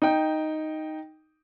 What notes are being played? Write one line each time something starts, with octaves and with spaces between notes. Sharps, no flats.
D#4 G5